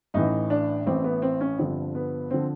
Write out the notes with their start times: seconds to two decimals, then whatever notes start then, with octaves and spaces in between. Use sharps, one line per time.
0.14 A1 A2 E3 D#4
0.50 D4
0.86 A1 A2 E3 C4
1.04 B3
1.22 C4
1.41 C#4
1.58 G1 G2 D3 F3 C4
1.95 B3
2.31 D3 F3 C4